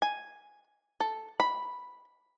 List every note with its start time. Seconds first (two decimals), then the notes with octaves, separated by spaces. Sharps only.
0.02 G#5
1.00 A4
1.40 B5